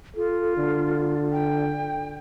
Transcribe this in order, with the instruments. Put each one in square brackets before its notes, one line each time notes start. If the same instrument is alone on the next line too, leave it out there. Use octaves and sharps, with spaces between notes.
[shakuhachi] F4 [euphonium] A4
[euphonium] D3
[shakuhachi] G5